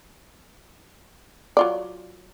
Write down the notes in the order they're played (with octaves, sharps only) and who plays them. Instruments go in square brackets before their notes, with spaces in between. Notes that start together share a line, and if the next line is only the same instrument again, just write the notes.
[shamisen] F#3 F4 D5